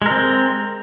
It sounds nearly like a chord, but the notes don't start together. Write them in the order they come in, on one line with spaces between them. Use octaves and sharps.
G#3 A#4 C4